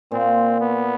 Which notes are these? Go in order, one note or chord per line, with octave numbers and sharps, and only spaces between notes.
A#2 C4
B3